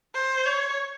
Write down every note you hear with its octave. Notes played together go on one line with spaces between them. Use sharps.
C5
C#5